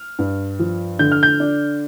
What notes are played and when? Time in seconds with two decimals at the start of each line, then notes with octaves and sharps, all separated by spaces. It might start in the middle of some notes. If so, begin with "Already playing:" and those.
Already playing: F6
0.19 G2
0.59 F3
0.99 D3 G6
1.12 F6
1.23 G6
1.40 D4